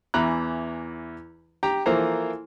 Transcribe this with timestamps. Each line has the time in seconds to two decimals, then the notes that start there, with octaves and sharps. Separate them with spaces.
0.14 E2 E3 A#5 B5 F#6
1.63 G4 G5 A#5
1.86 E3 F3 A#3 A4 C5 A#5